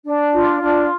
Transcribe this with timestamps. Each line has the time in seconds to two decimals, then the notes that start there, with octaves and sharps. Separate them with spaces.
0.05 D4
0.32 F4
0.61 D4